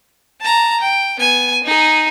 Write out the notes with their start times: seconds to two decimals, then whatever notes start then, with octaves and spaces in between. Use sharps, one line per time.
0.41 A5 A#5
0.80 G5
1.19 B3 G#5
1.63 D#4 G#4